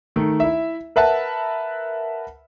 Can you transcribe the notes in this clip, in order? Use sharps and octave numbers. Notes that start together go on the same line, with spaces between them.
D#3 A3
E4 E5
A#4 B4 E5 F#5 A5 B5